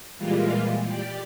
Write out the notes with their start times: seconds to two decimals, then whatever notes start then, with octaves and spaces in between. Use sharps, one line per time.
0.18 A#2 E3 G3 G#3 A#3 F4
0.87 G4 D5